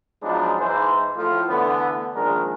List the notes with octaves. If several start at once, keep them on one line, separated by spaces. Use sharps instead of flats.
F3 F#3 G#3 B3 D4 D#4
G#2 E3 C5
A2 F3
D3 E3 A3 B3
A#1 D#3 G#3 D4 A#4